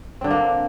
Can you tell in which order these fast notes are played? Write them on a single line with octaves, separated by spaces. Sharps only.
C4 D3 D4 A#3